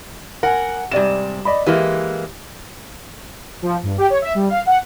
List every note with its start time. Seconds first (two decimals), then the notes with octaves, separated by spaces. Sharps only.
0.43 A#4 F#5 G#5
0.91 G#2 C3 G3 D5 E7
1.45 D5 D#5 B5
1.66 E3 G#3 A#3 G4
3.62 F3
3.83 G2
3.98 G4
4.10 C#5
4.22 E5
4.35 G3
4.49 F5
4.66 F#5